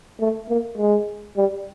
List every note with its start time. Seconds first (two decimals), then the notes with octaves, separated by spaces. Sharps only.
0.20 A3
0.49 A#3
0.78 G#3
1.37 G3